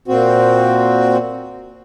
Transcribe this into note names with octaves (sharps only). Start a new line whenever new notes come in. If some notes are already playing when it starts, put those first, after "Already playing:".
A#2 C4 F#4